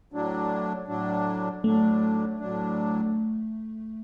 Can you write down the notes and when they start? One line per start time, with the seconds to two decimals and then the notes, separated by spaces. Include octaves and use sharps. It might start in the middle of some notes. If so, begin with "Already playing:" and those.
0.12 A2 F#3 D4
0.88 A2 F#3 D4
1.64 A2 F#3 A3 D4
2.40 A2 F#3 D4